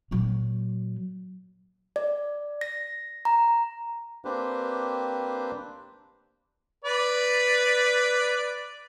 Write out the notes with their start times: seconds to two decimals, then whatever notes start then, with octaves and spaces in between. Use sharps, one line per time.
0.11 A#2 F#3
1.96 D5
2.61 A#6
3.25 A#5
4.25 A#3 C4 D4 G4 B4 C5
6.85 B4 D5